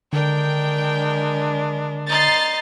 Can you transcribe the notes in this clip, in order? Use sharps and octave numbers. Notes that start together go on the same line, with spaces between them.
D3 G#3 D4 A#4 G5
C5 D#5 A#5 A6 C7